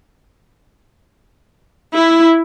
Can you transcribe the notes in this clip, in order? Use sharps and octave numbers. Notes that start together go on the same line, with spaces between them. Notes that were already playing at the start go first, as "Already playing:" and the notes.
E4